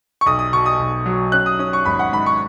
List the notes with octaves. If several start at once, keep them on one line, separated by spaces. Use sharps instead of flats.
C#6
B1 D#6
D#6
B2 C#6
D#6
B1
F#3
C#4 F#6
D#6
C#4 D#6
C#6
G#1 B5
F#5
G#2 B5
C#6